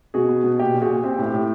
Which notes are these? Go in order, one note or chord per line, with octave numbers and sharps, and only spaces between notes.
B2 F#4 G#4
B3
B2
A#2 G4
A#2
F#4 G#4
A#2
C4 G4
A2
G4
A2